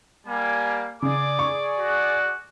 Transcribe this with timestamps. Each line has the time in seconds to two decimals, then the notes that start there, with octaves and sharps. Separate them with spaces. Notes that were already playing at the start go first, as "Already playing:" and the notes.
0.26 G3 A#3 G#5
1.02 C#3 G#4 D5 D6
1.39 C#6
1.79 F#4